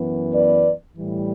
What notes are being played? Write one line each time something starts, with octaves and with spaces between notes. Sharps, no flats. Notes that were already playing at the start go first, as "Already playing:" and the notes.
Already playing: F#2 E3 B3
B4 D5
A2 E3 G3